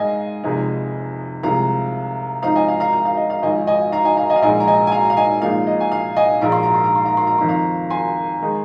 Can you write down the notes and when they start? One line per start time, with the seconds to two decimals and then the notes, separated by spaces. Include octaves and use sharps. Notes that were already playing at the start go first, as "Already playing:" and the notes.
Already playing: G#2 G#3 D#5 F5 G#5
0.44 F1 F2 C3 G#3 D#4
1.43 C2 C3 F3 G#3 F5 A#5
2.43 G#2 F3 C4 D#4 F5 A#5
2.56 D#5 G#5
2.68 F5
2.80 F5 A#5
2.93 F5
3.05 F5
3.17 D#5
3.30 F5
3.42 G#1 G#2 F3 D#5 G#5
3.67 D#5 G#5
3.92 F5 A#5
4.05 D#5 G#5
4.17 F5 A#5
4.30 D#5 G#5
4.36 F5
4.42 A#1 G#2 G#3 D#5 G#5
4.60 A#5
4.67 D#5 G#5
4.87 G#5
4.92 F5 A#5
5.10 F5
5.17 D#5 G#5
5.42 A#1 A#2 G#3 D#4 F5
5.67 D#5
5.80 G#5
5.92 F5
6.17 D#5 G#5
6.41 A#1 G#2 G#3 D#4 A#5
6.52 C6
6.63 A#5
6.74 C6
6.84 A#5
6.95 C6
7.06 A#5
7.17 C6
7.27 A#5
7.38 F2 D#3 C4 D#4 C6
7.48 F5 A#5
7.90 G#5 C6
8.42 D#3 G#3 D#4